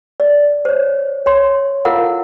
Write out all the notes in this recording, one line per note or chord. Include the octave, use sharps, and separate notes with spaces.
D5
C5 C#5
C#5 C6
E4 F4 A4 A#4 F5 F#5